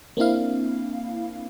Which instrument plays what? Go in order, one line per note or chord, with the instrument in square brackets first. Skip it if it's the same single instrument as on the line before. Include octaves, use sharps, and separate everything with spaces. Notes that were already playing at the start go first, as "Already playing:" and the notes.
[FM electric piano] A#3 C4 D4 E4 F5